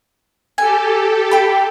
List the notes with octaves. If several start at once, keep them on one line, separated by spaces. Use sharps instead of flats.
G4 A4 G#5
G5 B5